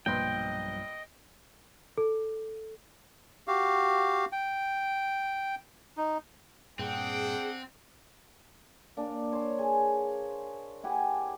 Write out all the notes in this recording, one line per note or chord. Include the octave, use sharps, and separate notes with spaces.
B1 G2 A#2 F3 B4 D#5 G5 C6
A4
F#4 G4 F5
G5
D#4
G2 A#2 C4 D4 G#4 F#5 G5
A#3 D4
C5 C#5
G#4
E4 G4 F#5 G#5